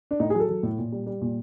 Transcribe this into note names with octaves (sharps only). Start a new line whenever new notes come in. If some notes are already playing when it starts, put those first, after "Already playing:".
D4
A2 D#4
G#4
F#3 A4
F#3
A2
A#2
G3
G3
A#2